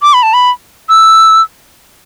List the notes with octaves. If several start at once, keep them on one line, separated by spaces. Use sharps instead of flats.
D6
B5
A5
B5
E6